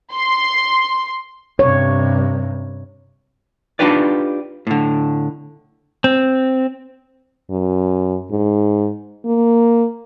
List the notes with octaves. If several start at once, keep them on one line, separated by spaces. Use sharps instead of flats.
C6
G2 C3 C#5
D4 D#4 F4 G4 B4 D5
A2 D3
C4
F#2
G#2
A#3